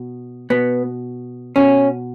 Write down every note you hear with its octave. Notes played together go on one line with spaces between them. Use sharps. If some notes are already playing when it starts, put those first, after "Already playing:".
Already playing: B2
B2 B3
B2 C#4